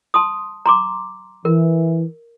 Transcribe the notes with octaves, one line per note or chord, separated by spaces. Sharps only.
A5 C6 D#6
A#5 C6 D6
E3 A#4